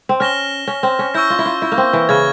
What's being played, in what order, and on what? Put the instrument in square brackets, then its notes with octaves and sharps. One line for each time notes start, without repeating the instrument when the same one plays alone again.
[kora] C4
[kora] C#4 [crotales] F6 A#6 E7 G7
[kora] C#4
C4
C#4
[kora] E4 [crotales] C#6 E6 G6 A#6
[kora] F4
E4
F4
E4
A#3
C4
E3
[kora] C#3 [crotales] C#6 F6 G#6